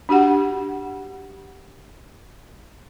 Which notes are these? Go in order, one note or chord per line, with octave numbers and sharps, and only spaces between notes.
D4 F#4 G4 F#5